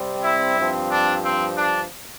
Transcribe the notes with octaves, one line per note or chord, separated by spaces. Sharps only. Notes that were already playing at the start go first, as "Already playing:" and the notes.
Already playing: C3 G3 C4
E4
G2 F3 C4
D4
C4
D4